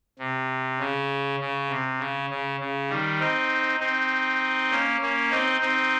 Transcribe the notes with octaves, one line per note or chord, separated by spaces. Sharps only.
C3
C#3
C#3
C3
C#3
C#3
C#3
D#3 G3
C4 D#4
C4 D#4
A#3 C#4
A#3 C#4
C4 D#4
C4 D#4